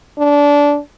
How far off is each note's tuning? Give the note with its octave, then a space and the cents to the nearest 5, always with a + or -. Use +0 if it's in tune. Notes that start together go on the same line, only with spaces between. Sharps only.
D4 -20